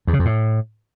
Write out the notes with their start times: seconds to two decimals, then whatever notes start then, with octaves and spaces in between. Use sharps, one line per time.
0.07 E2
0.13 C#3
0.19 F2
0.25 A2